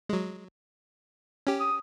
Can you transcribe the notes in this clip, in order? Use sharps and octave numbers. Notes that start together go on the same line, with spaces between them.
F#3 G#3
C#4 G4
D#6